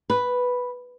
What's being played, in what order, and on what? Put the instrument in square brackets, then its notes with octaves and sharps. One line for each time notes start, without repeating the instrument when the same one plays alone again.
[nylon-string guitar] B4